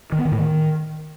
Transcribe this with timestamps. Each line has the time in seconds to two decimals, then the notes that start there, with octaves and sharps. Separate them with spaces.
0.12 D#3
0.19 B3
0.25 D#3
0.32 A2
0.38 D#3